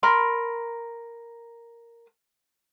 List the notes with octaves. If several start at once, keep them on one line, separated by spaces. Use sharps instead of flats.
A#4 B5 C6